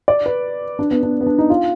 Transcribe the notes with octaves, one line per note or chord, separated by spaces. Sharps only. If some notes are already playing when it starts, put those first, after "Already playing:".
D5
B4
D4
B3
D4
B3
D4
D#4
F4